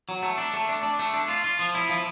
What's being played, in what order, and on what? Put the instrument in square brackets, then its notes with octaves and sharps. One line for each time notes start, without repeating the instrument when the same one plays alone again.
[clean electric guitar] F#3
A3
D4
A3
D4
D4
A3
D4
F4
F4
F3
E4
F3